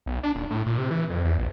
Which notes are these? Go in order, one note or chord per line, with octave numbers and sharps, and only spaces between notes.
B1
D4
D#1
A2
A#2
C3
E3
F2
E2
A#1